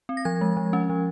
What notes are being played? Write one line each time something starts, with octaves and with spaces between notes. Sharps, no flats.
C4
A#6
F3 G#6
G#3
F3
C#4
F3